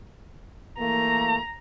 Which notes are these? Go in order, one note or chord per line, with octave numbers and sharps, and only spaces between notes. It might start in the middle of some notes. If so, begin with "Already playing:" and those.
E3 A3 A#3 A#5